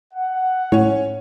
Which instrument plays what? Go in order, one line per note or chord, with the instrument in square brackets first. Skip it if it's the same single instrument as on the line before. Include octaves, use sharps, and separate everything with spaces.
[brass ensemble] F#5
[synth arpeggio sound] A2 [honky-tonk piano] C#4 C#5